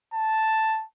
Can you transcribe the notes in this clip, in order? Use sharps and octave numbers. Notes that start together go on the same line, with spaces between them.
A5